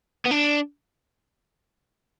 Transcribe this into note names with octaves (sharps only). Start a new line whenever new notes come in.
B3
D4